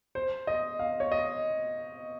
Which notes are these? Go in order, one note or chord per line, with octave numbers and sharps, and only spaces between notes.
C5
D#5
F5
C#5
D#5